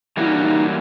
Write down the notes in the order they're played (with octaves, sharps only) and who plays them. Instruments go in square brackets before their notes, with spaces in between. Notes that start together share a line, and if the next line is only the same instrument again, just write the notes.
[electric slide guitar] E3 G3 A#3 C#4 F#4 [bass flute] E4
[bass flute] D#4
D4
D#4